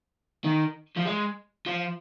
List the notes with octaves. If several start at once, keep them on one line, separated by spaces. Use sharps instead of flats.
D#3
F3
G#3
F3